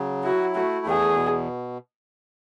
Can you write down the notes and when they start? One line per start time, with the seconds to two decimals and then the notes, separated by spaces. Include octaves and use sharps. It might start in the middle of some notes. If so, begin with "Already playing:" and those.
Already playing: C#3 F#3
0.24 E4 F#4
0.55 A3 F#4
0.85 E2 G#4
1.16 B2